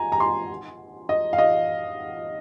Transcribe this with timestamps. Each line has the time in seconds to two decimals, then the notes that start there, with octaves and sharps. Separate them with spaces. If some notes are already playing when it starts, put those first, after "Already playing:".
Already playing: G#5 A#5
0.12 A#5
0.20 C6
1.09 D#5
1.33 F5
1.38 D#5